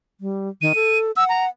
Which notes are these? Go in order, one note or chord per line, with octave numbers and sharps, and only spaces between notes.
G3
D#3 D#7
A4
F#5 E6
A#5